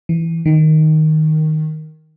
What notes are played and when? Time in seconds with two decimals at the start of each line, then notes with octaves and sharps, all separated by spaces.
0.09 E3
0.46 D#3